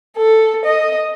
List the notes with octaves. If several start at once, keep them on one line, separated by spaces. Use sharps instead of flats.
A4
D#5